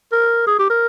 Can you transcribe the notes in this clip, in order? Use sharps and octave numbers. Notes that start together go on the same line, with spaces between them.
A#4
G#4
G4
A#4